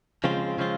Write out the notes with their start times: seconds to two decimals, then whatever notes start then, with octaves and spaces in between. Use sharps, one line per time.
0.24 C#3 F3 G#3 C4 F4
0.58 C#3 F3 G#3 C4 F4